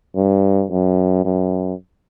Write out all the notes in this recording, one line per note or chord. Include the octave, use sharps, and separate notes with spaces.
G2
F#2
F#2